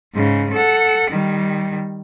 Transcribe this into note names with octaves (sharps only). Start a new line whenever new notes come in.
G#2 C#3
A4 F#5
D#3 G3